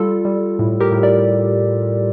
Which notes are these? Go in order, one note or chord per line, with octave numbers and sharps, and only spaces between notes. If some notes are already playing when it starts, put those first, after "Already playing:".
Already playing: G3 F4 A4
G3
A2
G4 A#4
A2
A#4 D5